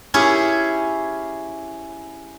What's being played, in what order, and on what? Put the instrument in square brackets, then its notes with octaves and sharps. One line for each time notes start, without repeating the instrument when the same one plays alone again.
[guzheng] C#4 E4 G4 G#4 C#5